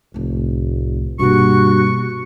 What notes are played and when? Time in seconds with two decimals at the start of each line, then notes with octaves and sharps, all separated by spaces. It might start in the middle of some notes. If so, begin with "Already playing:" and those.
0.14 F1 C2 A2
1.20 G2 B2 A#3 F#4 C#6